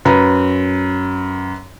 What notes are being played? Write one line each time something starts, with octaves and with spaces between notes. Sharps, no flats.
F#2 B4 A#5